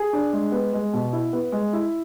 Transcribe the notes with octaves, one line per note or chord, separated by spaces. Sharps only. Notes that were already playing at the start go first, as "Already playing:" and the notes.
Already playing: G#4
D4
G#3
B3
G#3
B2
E4
B3
G#3
E4